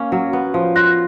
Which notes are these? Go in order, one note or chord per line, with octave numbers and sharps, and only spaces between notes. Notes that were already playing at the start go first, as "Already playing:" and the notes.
Already playing: A#3 C#4
F#3
B3
F3
F4 F#6 A#6